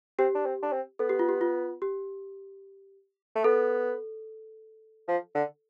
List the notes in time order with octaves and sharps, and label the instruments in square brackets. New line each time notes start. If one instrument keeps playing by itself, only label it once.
[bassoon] C4 [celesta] G4
[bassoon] D4
C4
D4
C4
[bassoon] B3 [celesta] A4
[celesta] G4
F4
G4
F4
G4
[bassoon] A3
[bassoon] B3 [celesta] A4
[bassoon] F3
D3